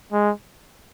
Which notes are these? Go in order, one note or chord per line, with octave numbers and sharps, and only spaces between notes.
G#3